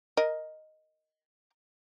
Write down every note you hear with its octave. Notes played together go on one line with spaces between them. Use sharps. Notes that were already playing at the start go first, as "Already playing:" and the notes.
A#4 D#5